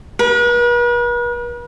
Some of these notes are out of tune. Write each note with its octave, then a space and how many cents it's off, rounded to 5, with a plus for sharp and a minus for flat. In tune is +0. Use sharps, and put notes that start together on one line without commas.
B4 -45